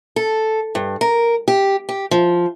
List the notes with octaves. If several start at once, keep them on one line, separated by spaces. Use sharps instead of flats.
A4
G2
A#4
G4
G4
F3